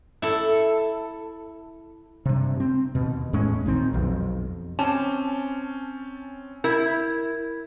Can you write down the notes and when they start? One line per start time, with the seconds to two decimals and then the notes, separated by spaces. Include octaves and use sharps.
0.22 E4 A4
2.25 G2 C3
2.60 C4
2.95 D#2 B2
3.33 E2 A2 G#3 C#4
3.66 A#1 D#3 C4
3.94 B1 F2
4.79 C4 C#4 G#5 A5
6.64 E4 A#4 G#6